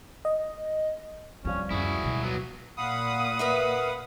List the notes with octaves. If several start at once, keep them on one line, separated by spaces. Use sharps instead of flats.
D#5
D1 F3 G3 C4 C#4
F#2 E4 F#4 G#4
B2
F#3 B3
A#2 F5 F#5 B5 D#6
A#4 B4 E5